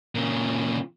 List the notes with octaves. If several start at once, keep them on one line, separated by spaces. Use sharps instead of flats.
A#2 C#3